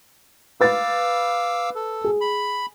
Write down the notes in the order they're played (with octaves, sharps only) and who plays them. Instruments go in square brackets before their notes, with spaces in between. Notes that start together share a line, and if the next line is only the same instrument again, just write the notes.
[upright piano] B4 A6 [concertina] F5 D6 E6
[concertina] A4
[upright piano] G#4
[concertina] B5